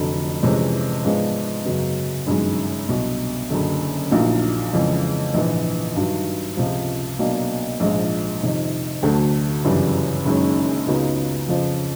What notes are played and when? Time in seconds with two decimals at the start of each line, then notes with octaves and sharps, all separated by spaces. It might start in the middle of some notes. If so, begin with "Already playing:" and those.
Already playing: F1 F2 D3 F#3
0.43 F2 C3 E3 G#3 C#4
1.04 G#2 F3 G#3 B3 D4
1.65 F#2 C#3 F#3 B3
2.27 G1 F#2 D#3 G#3
2.89 C2 B2 F#3
3.50 F#1 F#2 D3
4.11 A#1 A#2 F#3 A#3 D#4
4.73 F2 C#3 E3 G#3
5.34 A#1 G#2 E3
5.96 G2 D#3 F#3
6.57 C#2 C3 F3
7.19 B1 B2 F#3 A#3 D4
7.80 A#1 G#2 F3 G#3
8.41 F2 C3 D#3
9.03 D2 D3 F#3 A3
9.64 G1 F#2 C#3 E3 G3
10.25 F#1 F#2 D#3 G#3 C#4
10.87 C#2 C#3 F#3 B3 D#4
11.49 F2 C#3 F3